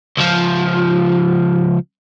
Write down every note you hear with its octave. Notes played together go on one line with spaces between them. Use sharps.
C#2 F3